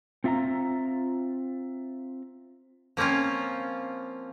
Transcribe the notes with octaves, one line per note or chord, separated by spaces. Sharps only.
C4 F4 E5 F5 A#5
F3 A#3 C4 C#4 F4